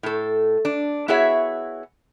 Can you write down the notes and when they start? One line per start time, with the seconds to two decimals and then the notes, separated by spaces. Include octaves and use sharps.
0.03 A2 A4
0.65 D4
1.08 B3 E4 F#4 G#4 C#5 E5